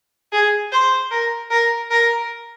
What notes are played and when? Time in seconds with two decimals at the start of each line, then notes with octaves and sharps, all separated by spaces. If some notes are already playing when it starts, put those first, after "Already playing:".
0.32 G#4
0.72 C5
1.11 A#4
1.51 A#4
1.91 A#4